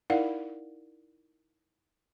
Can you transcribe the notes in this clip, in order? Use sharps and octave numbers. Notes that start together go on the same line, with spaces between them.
D#4 E4 A#4 D5 F5 F#5